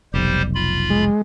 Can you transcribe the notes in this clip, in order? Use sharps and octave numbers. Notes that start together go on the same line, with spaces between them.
F1 B1 G3 G4 C5
F4 B5
G#3